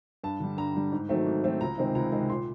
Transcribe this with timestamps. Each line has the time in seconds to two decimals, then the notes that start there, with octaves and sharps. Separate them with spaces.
0.23 G2 A5
0.40 D3 G3
0.58 G2 A#5
0.75 D3 G3
0.92 G#2
1.09 D#3 F#3 A3 C4
1.26 G#2
1.44 D#3 F#3 A3 C4
1.61 C#2 A#5
1.78 C3 D#3 G#3 C4
1.95 C#2 A#5
2.12 C3 D#3 G#3 C4
2.29 A#2 C6